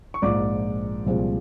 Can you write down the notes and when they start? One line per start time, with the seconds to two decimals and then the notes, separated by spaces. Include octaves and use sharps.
0.14 C#6
0.22 A#1 G#2 F3 A#3 D5 D6
1.06 C2 A#2 F3 G#3 C4